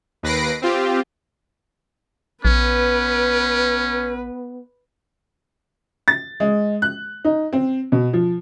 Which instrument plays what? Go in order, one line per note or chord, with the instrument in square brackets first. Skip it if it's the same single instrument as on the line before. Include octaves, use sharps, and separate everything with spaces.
[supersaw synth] D#2 B4 A#6 C7 D7
C4 F4 G4
[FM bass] A#1 [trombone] B3 [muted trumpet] C#4 [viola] B4
[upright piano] A6
G#3
F#6
D#4
C4
B2
F3